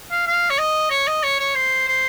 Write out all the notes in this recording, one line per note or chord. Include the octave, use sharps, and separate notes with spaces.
F5
F5
C#5
D#5
C#5
D#5
C#5
C#5
C5
C5